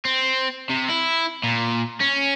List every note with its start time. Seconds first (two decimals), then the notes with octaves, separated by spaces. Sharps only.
0.05 C4
0.69 C3
0.89 E4
1.44 A#2
2.01 C#4